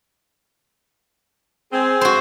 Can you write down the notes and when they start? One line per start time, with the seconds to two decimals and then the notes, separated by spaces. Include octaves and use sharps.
1.72 C4 G#4
2.01 F#4 C5